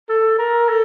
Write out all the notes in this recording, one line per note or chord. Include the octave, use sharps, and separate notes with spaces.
A4
A#4
A4